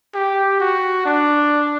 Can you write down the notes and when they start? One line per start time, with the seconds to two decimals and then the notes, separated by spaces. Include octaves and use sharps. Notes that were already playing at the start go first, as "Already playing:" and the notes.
0.15 G4
0.60 F#4
1.06 D4